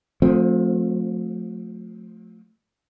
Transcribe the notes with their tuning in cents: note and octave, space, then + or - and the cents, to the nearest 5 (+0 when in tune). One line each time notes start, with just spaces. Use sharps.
F3 +40 A3 +0 C4 +0